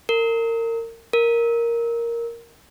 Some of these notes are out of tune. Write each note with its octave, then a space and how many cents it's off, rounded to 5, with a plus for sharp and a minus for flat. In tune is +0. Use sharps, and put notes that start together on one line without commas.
A#4 -30
A#4 +0